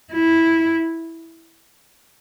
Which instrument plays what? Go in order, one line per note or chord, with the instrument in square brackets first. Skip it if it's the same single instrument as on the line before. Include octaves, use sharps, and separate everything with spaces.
[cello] E4